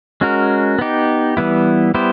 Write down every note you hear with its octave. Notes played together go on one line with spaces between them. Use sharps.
G#3 C#4 F#4 A#4
B3 D#4 G4
E3 G3 B3 E4
G3 B3 E4 G4 C5